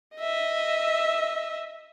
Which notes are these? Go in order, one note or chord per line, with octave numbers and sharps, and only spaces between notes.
D#5 E5